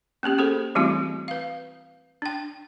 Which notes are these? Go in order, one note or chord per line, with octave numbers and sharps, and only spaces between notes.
A#3 B3 C#4 G4
C#4 G#4 A4 C5
E3 G3 A3 C4 E4 F#4
B4 F5
D4 G5